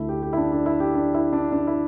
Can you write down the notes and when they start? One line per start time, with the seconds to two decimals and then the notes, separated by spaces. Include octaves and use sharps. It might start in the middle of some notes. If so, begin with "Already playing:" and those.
Already playing: D2 D3 A3 E4
0.09 G4
0.22 G4
0.33 E4
0.37 D4
0.52 D4
0.66 E4
0.80 G4
0.95 D4
1.14 E4
1.33 D4
1.52 D4
1.67 E4